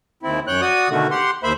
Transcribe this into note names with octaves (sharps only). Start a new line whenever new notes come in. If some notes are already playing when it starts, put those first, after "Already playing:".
D#2 C4 E4
F#2 C#5 G5 F#6
F#4 D5 D#6
B2 D3 D#3 A3 F#4
G4 F#5 C6
D#2 A#3 C5 E5 B5